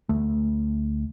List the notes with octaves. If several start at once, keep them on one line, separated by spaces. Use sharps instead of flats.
D2 A3